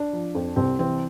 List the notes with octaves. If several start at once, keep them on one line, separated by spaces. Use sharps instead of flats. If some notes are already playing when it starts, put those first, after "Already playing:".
Already playing: D4
F3
F2
C2 C4
E3 C4